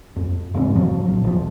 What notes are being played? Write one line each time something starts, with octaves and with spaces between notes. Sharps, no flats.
F2
F#1 G#2 C4
F3 F#3
A#1
D#1 F3